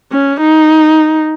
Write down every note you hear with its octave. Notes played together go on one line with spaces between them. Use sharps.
C#4
D#4